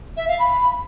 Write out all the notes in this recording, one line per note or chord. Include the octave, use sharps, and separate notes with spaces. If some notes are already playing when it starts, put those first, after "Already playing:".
E5
F5
B5